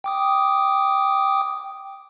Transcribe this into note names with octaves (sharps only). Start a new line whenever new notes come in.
G5 D6 D#6